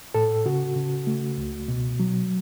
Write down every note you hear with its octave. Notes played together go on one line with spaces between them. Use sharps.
A2 A4
C#3 F#4
C#3
A3
C#2
B2
F#3